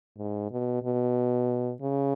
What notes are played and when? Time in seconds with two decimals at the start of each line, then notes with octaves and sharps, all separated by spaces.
0.18 G#2
0.51 B2
0.83 B2
1.82 C#3